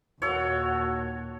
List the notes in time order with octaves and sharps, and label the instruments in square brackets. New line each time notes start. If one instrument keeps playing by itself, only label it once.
[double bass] D#2 A#2 [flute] F#4 [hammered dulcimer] A4 C#5